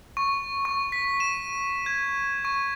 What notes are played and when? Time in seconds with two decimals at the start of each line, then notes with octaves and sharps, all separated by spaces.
0.17 C#6
0.65 C#6
0.92 B6
1.20 E7
1.86 G#6
2.45 C#6